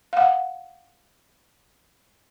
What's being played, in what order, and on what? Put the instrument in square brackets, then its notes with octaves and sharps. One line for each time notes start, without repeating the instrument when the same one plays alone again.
[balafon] F5 F#5